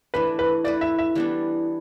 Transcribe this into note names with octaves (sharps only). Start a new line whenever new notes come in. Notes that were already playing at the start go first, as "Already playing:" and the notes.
E3 A3 D4 B4
B4
A3 E4 B4 D5
E5
E5
E3 G3 B3 D4